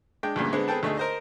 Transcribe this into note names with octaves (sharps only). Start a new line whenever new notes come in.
G#3 D4 G5
D2 G2 A#2 C#3
D3 G#3 B3 C4
B3 C4 G#4 A4 G5 A5
D2 A3 D#4 G#4
A#4 C5 D#5